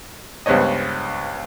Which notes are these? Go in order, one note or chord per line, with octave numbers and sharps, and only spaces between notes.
C#2 G2 B3 C5 C#5 D#5